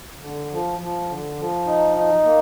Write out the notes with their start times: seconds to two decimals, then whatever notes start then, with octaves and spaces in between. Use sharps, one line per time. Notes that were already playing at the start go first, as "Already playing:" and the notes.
0.21 D3
0.51 F3
0.80 F3
1.09 D3
1.38 F3
1.66 D#4
1.97 D#4
2.25 A#3